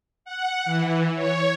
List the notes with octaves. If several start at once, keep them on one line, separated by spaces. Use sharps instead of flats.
F#5
E3
C#5